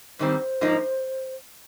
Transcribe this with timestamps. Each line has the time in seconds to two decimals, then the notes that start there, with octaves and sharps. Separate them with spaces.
0.19 G#2 D#3 G3 C4 C5
0.61 G#2 F3 A#3 D#4